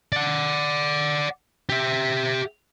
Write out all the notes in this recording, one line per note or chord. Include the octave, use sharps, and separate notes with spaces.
D5 F#5
G4 E5